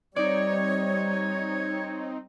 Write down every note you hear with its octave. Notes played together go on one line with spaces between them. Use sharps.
G3 C4 D#4 C#5 D5